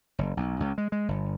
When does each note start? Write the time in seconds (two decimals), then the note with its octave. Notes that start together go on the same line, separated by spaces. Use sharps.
0.19 F#1
0.37 B1
0.60 C#2
0.78 G#3
0.92 G#3
1.08 G1